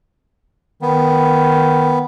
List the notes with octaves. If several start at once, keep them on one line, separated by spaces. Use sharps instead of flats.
D#3 B3